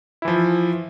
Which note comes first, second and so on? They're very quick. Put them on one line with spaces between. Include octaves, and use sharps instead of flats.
E4 E3 F3